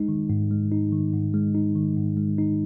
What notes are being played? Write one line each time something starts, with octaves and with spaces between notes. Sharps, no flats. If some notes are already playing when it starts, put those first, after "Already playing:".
Already playing: G#3 D#4
D#3
G#2
G#3
D#4
D#3
G#2
G#3
D#4
D#3
G#2
G#3
D#4